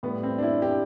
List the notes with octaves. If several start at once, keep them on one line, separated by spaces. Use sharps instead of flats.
A2 G3 B3
C4
D4
E4
G4